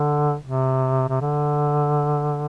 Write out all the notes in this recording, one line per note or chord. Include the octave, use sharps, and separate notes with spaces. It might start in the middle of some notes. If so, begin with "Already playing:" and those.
Already playing: D3
C3
C3
D3